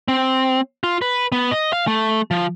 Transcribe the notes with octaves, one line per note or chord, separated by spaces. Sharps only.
C4
F4
B4
B3
D#5
F5
A3
F3